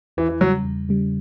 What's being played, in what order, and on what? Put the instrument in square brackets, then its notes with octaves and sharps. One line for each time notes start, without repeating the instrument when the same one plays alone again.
[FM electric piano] E2 [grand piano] E3
[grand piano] E3
[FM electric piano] C#3 G3 [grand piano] F#3
[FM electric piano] E2
C#3 G3